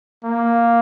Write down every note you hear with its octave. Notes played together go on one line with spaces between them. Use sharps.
A#3